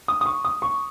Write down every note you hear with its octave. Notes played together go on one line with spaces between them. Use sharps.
D#6
D#6
C#6
D#6
C#6